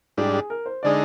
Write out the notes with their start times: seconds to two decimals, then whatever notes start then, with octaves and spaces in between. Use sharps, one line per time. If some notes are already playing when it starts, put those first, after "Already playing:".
0.18 G#2 G3 D4 G4
0.34 G#4
0.50 A#4
0.66 C5
0.83 D3 G#3 D#4 D5